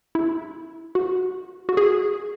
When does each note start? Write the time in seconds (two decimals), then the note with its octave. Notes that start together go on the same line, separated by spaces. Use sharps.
0.15 E4
0.95 F#4
1.69 F#4
1.77 G#4